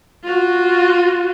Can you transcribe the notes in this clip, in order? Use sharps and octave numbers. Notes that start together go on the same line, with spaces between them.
F4 F#4